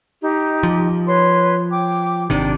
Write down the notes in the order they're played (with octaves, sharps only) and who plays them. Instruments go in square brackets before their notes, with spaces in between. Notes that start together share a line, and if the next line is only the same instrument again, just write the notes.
[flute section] D#4 G4
[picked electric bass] F3
[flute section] B4 C#5 C6
G5 D6
[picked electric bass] G#1 C3 D#3 [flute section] D4